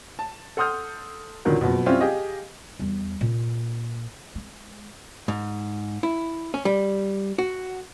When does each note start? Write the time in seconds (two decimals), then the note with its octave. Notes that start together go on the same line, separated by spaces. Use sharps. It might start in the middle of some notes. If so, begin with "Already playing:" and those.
0.19 A5
0.57 A4 F#5 C6 D#6 F6 G6
1.45 C#2 A#2 D3 D#3 F#3 A#3
1.61 F#1 F2 B2
1.86 G3 C4 C#4 E4 F4 G4
2.00 G4 G#4 D#5 F5
2.80 E2 G3
3.21 A#2
4.35 G#3
5.28 G#2
6.03 E4
6.54 C#4
6.65 G3
7.38 F#4